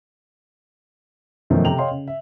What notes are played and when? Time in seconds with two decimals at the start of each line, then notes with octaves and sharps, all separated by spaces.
1.50 F#2 B2 D#3 F3 A3
1.65 C3 A4 G5 A#5 F7 F#7
1.79 C#5 D#5 F5 G5 C6
1.91 C#3
2.08 E5